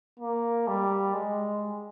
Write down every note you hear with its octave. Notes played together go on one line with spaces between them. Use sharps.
A#3
G3
G#3